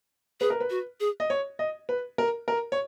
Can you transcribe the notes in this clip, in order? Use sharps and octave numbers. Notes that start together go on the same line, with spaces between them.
G#4 B4
A#4
B4
F#4
G#4
D#5
C#5
D#5
B4
A#4
A#4
C#5